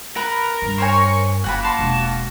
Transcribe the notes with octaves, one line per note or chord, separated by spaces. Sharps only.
A#4 B4
G2
C5 C#5 G#5 C#6
F#1 A#3 F4 F#4 F#5 G#5 B5
A5 C6
E1